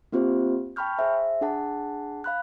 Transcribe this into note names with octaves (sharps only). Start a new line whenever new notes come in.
A#3 C4 F4 G4 C5
G5 A5 B5 C#6 F6 G6
G#4 C5 E5 G#5
D4 G#4 F#5 A5
F5 B5 F#6